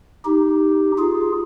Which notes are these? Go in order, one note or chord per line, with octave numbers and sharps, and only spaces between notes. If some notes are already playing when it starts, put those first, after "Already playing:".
D#4 G4
F4 G#4